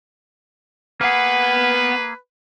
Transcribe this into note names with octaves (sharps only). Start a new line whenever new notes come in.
A#3 B3 G#4 B4 F#5